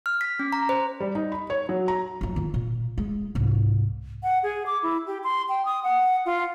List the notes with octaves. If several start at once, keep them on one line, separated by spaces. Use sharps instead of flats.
F6
B6
C#4
A#5
C5
G3
D#4
B5
C#5
F#3
A#5
F2 F#3
D#3 F4
A#2
G#3
C2 G#2
F#5
G#4
D6
E4
G4
C6
G5
D#6
F#5
F4